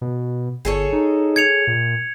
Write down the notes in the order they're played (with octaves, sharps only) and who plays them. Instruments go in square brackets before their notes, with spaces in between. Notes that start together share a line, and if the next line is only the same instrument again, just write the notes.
[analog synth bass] B2
[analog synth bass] G1 [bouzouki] G#4 A4 C#5
[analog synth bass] D#4
[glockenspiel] G#6 C#7 F7
[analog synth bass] A#2